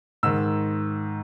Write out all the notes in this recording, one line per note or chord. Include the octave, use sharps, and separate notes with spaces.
G#2 D#3 E6